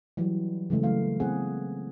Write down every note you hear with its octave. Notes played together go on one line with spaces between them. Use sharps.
E3 F#3 G3
C#3 E3 G#3 A3
F#3 A3 A#3 F5
B3 C4 E4 G#4 F#5